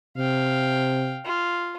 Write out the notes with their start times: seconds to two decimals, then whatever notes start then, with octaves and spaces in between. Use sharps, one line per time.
0.18 C3 F5 G5
1.25 F4